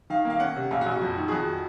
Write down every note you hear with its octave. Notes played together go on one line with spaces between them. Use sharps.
D#3 F5
A#3
F5
C#4 F#5
C3
A#1 F5
F#4
A#1
F#4
F2
D#3
G#4
F2 F#4